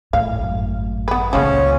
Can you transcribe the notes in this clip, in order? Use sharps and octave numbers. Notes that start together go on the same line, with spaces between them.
A2 F5
G#1 F#2
B3 B4
C#2 A#2 F3 G#3 C#4